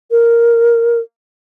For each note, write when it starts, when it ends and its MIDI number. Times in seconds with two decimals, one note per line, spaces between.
0.11 1.00 70